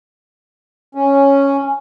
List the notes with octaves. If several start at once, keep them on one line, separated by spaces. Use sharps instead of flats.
C#4